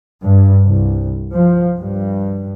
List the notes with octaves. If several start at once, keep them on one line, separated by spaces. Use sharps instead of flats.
G2
C2
F3
G2